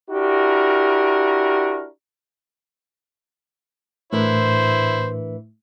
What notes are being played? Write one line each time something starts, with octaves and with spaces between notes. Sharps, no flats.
D4 E4 F#4 G4 A#4
A2 E3 D4 E4 A#4 C5